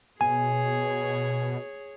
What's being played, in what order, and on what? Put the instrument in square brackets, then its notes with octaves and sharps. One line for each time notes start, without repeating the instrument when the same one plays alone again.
[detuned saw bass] B2 [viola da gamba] G#4 C#5 [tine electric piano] G#5